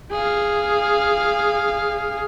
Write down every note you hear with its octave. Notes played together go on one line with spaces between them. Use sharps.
G#4 F5